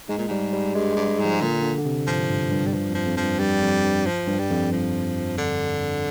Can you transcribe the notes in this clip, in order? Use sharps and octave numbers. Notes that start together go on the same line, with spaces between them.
G#2 G#3
A#2
G#2 G3
G3
G2 G#3
G#3
G2
G3
G#2
F3
A#2 D3
D3
D3
C3
G#2 F3
G2
G2
G3
G2 F3
F2 F3
F2
F3
G2
G2 G3
F2
G2
F3
G2
G3
F2
F3
D3